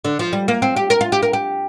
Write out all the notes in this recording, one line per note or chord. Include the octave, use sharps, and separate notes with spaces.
D3
F3
G3
A#3
C4
G4
A#4
F4
G4
A#4
G4